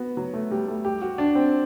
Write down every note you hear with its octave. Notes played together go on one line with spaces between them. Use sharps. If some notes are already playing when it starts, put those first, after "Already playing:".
Already playing: B3 F#4
F#3
A3
G3
A3
G4
F#4
D4
C4